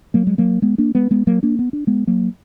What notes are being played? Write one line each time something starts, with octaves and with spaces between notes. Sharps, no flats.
F#3 A#3
G#3
F#3 A#3
G#3 B3
A#3 D4
G#3 B3
G#3 B3
F#3 A#3
A#3 D4
B3
D4
G#3 B3
F#3 A#3